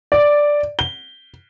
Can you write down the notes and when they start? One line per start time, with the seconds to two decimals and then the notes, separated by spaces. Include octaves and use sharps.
0.12 D5
0.79 G7